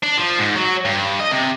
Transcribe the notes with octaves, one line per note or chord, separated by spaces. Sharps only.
D4
F3
G#2
F#3
G2
D#5
C3